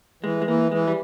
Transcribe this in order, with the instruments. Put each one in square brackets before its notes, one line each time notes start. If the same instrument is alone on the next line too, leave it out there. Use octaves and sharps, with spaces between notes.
[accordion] E3 [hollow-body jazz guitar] G#3
[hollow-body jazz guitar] G#3
[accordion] E3 [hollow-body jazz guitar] A#3
[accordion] E3 [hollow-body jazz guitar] G#3
[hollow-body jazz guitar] G3